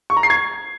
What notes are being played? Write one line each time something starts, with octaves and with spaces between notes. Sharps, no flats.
C#6
A#5
C7
G#6